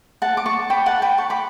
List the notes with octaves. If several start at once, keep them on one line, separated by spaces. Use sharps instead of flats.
F#5 A5
D6
A5 C#6
G5 B5
F#5 A5
G5 B5
A5 C#6
B5 D6